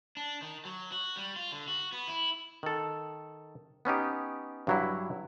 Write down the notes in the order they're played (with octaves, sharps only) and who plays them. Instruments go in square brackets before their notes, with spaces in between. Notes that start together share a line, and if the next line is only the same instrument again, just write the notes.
[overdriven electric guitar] D4
D#3
F#3
F#4
G3
F4
D3
F#4
B3
E4
[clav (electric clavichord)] D#3 A4
B3 C#4 D#4 G4
G2 F#3 E4